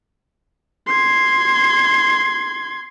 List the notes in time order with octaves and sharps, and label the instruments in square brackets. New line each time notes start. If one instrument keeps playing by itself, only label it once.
[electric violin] C6 G#6